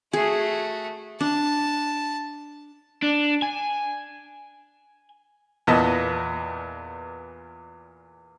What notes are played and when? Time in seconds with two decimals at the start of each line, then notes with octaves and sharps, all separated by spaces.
0.13 A3 F#4 G#4
1.21 D4 A5
3.02 D4
3.42 G#5
5.67 E2 A#2 B3 D#5 A5